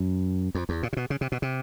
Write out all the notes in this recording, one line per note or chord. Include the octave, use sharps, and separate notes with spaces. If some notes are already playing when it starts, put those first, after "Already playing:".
Already playing: F#2
F2
E2
A#2
C3
B2
C#3
C3
B2
C3